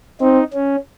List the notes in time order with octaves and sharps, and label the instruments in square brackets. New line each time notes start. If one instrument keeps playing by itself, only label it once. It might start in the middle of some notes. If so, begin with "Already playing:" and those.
[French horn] C4 [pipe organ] D#4
[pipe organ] C#4